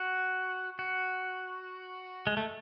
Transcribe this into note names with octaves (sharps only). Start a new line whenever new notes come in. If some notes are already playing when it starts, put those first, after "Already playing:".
Already playing: F#4
F#4
G#3
A3